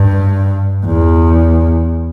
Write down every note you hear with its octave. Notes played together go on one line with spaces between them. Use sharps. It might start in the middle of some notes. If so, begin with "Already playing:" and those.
Already playing: G2
E2